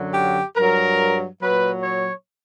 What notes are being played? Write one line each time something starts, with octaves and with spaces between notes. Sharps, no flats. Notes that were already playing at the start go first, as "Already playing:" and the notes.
Already playing: F#2 D3 F#3
G4
G2 F#3 A#4
A#2 F#3 B4
C#5